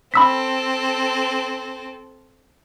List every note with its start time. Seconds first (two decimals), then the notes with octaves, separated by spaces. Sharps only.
0.14 C4 A4 B5 E6 B6